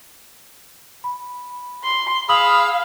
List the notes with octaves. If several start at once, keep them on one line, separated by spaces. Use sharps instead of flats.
B5
C6
G#4 F5 B5 D#6 E6 F#7